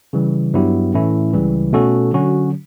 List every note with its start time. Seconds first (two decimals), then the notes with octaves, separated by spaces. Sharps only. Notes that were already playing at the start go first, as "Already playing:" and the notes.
0.13 C#3 E3 G3
0.54 G2 F#3 B3 E4 G4
0.94 A2 E3 A3 C#4 E4
1.33 C#2 C#3 E3 G3
1.73 B2 A3 C#4 F#4 A4
2.12 D3 F#3 C#4 F#4